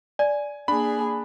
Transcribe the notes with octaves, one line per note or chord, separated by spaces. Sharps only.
D5 G#5
A#3 D4 G#4 B5